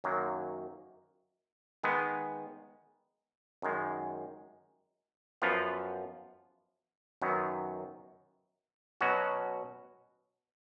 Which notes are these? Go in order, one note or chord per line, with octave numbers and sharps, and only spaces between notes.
F#2 D#3 F#3 A#3
D#3 G#3 B3
F#2 D#3 G#3
F#2 F3 B3 F4
F#2 D#3 F#3 B3
B2 F#3 C#4 F#4